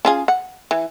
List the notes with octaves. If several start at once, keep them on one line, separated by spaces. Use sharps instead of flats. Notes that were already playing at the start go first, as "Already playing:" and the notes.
C#4 F4 G#4
F#5
E3